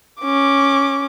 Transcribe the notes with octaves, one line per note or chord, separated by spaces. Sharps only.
C#4 D6